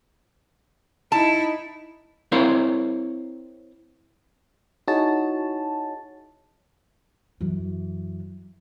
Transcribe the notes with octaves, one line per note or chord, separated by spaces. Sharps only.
D#4 E4 A5
C4 E4 A#4 C5 C#5 F5
D#4 E4 F#4 G#4 C#5 A5
F#2 E3